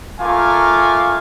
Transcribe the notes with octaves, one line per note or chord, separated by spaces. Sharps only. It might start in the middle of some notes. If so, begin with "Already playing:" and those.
A3 F4 A#4 F5 G#5 D6